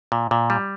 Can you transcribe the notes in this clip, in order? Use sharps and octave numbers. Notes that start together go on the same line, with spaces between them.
A#2
A#2
G3